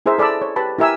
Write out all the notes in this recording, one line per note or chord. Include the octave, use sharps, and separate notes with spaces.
E4 G#4 A#4 C5 E5
A4 D5 A5 B5 E6
C#5
G4 B4 A5 B5
E4 G4 A#4 E5 G#5 E6